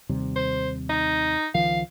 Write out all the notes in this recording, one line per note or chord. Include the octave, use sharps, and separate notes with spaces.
D#2 C3 G3
C5
D#4
C#2 D#3 F3 F5